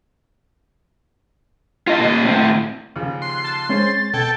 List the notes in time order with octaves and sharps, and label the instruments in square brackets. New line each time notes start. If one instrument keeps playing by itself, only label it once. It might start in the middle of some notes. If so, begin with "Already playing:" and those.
[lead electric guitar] F4 D#5
A#2 D#5
A2 C4
[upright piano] D#2 C#3 F3
[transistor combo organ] C6 [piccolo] F#6
[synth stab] A5
[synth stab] G#3 C4 C#4 [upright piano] C5 C#5 [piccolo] A6
[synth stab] B2 [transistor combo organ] A4 G5 [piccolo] G#6